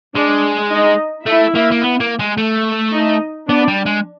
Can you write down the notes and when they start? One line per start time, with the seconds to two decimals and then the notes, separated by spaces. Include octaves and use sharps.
0.15 G#3 D4 D5
0.71 D#4 D#5
1.26 A3 E4 E5
1.55 A#3
1.71 A#3
1.82 B3
2.00 A#3
2.19 G#3
2.37 A3
2.93 D#4 D#5
3.49 B3 D4 D5
3.68 G3
3.86 G#3